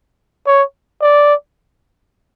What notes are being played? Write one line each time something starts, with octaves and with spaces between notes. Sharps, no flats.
C#5
D5